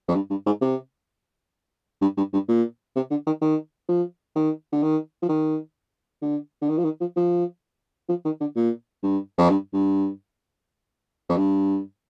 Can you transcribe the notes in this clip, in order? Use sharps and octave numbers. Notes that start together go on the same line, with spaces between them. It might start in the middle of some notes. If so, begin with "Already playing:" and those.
F2
G2
G2
G#2
C3
G2
G2
G2
A#2
C3
D3
D#3
D#3
F3
D#3
D3
D#3
F3
D#3
D3
D3
D#3
F3
D#3
F3
F3
F3
D#3
D3
A#2
G2
F2
G2
G2
F2
G2